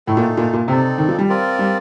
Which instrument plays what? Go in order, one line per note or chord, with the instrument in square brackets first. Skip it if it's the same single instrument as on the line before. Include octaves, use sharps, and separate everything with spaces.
[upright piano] A2 [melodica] A3 D#4 A4
[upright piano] A#2
A#2
A#2
[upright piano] C3 [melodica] C4 D#4 A4 D5
[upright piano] D#3
F3
G3
[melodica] C4 F4 A#4 D5
[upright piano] G3